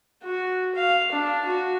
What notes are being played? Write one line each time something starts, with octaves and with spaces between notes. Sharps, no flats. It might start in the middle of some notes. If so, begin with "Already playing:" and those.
F#4
F5
D4
F#4